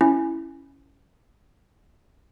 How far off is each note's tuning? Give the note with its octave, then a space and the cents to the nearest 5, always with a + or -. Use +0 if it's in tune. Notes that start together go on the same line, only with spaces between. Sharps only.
C#4 +0 E4 +5